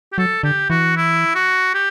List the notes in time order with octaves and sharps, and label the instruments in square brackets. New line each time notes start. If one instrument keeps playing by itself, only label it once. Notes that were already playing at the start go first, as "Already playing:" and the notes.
[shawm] G4
[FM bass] F#3 [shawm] A4
[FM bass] D3 [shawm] G4
[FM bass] E3 [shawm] F#4
[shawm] E4
F#4
G4